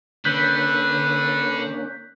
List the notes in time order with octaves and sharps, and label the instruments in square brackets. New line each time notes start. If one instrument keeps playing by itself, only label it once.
[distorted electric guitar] D3 [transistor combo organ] A#3 C#4 D4 [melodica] B4 [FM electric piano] F#6 G6 B6